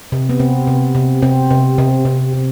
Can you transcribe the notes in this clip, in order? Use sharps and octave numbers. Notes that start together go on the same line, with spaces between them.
C3
B3
C3 C4
C3
C3
C3 C4
C3
C3
C3
C3